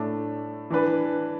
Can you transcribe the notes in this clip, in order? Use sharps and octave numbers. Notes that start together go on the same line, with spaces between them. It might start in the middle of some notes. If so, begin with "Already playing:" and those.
Already playing: A2 A3 D4
E3 D4 B4